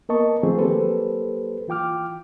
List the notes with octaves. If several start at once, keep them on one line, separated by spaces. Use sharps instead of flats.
A#3 B3 A#4 D#5 A5 C#6
D#3 F3 A3 C4 G#4
F#3 A#3 G4 A4 B4 C5
E3 F4 G5 D6 F6